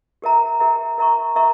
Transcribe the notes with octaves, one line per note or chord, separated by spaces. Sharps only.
G4 A#4 E5 A#5
G4 A#4 E5 A#5
A#4 E5 A#5 C#6
A#4 E5 A#5 C#6